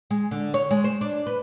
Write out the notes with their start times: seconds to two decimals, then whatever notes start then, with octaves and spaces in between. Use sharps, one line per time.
0.11 G#3
0.31 D3
0.54 C#5
0.71 G#3
0.84 C5
1.01 D4
1.27 B4